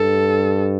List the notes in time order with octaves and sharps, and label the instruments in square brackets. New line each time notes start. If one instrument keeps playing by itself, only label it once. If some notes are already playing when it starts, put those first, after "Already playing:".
Already playing: [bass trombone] G2 [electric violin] A4